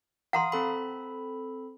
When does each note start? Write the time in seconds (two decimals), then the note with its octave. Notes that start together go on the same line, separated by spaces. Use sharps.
0.33 F5 F#5 A#5 C6 D#6
0.52 C4 A4 B5